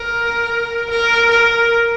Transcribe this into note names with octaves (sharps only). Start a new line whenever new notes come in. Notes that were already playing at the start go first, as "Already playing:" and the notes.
Already playing: A#4
A#4
A#4